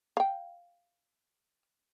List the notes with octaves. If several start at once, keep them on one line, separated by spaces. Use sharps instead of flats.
F5 G5